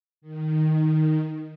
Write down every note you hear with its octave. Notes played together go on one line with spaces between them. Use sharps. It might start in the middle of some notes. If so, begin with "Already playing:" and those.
D#3